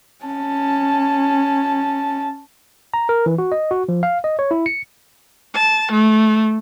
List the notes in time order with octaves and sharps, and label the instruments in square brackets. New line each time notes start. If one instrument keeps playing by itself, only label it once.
[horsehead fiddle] C#4 A5
[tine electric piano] A#5
A#4
E3
F#4
D#5
F#4
F3
F5
D#5
C#5
E4
C#7
[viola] A5
A3